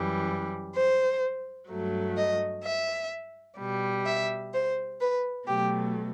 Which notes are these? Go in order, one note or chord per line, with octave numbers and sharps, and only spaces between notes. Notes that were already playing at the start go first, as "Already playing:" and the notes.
Already playing: F#2 E3 G3
C5
G2 F#3 A3
D#5
E5
B2 G3
E5
C5
B4
B2 F#3 A3 G4